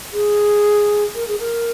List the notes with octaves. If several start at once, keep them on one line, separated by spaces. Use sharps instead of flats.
G#4
A#4
G#4
A#4